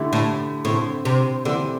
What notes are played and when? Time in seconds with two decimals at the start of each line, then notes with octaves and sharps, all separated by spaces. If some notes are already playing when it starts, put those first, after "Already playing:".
Already playing: D3 A3 E4 G4
0.13 A2
0.65 A2 D3 C4 E4
1.05 C3
1.45 D3 E3 C4 G4